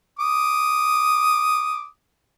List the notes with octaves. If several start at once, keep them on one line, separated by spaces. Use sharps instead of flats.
D6 D#6